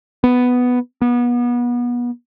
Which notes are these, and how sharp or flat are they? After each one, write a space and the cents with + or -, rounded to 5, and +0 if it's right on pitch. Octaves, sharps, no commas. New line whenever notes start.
B3 +5
B3 -30